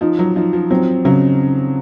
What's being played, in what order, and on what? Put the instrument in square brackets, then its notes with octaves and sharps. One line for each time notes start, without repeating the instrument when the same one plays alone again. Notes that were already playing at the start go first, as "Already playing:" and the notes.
[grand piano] F3 [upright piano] D#4
[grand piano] F#3
[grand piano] F3 [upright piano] D#4
[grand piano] F3
[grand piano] F#3 [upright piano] C4
[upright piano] C#3 [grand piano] F#3